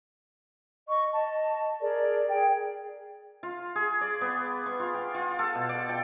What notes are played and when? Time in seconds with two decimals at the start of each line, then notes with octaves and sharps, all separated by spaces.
0.87 D#5 C#6
1.14 D#5 A5
1.81 G#4 A#4 D5
2.28 G#4 G5
3.43 F4
3.76 G#4
4.01 D5
4.21 B3
4.66 C#6
4.79 F4
4.94 G5
5.14 F4
5.39 A4
5.55 B2
5.69 D5
5.89 G5